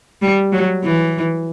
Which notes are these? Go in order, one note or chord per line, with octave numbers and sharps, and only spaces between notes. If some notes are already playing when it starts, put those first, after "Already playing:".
G3
F#3
E3